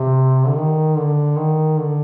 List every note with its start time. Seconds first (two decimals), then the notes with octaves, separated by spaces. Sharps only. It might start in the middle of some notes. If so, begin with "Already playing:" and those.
Already playing: C3
0.47 D3
0.56 D#3
0.97 D3
1.36 D#3
1.78 D3